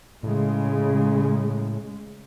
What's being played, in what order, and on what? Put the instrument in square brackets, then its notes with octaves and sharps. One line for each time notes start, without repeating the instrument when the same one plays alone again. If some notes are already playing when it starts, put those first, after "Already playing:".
[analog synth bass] A2 [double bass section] C#3 G#3